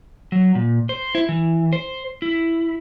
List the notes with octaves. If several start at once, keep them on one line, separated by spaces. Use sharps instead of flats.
F#3
A#2
C5
E4
E3
C5
E4